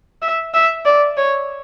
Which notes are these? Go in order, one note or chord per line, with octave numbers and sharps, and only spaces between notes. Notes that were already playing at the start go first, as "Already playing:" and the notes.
E5
E5
D5
C#5